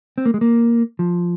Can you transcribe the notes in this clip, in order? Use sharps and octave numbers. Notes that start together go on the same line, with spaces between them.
C4
A#3
G#3
A#3
F3